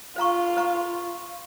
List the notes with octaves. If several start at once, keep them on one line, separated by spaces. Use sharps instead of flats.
F4 C5 F5 A#5 C#6
C5 F5 A#5 C#6